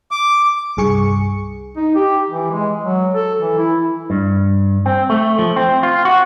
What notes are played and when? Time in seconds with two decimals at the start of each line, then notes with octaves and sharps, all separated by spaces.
0.11 D6
0.77 C2 G2 G#4 C#6 C#7
1.77 D#4
1.95 G4
2.30 E3
2.51 G#3
2.84 F#3
3.14 A4
3.41 E3
3.58 E4
4.10 G2
4.86 C4
5.10 A3
5.39 F3
5.56 C4
5.83 F4
6.05 F#4